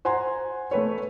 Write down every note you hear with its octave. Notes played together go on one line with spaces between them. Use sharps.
C5 F#5 G#5 A#5 C6
A3 B4 C#5